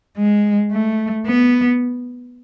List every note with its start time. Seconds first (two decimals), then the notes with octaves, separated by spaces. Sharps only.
0.17 G#3
0.71 A3
1.26 B3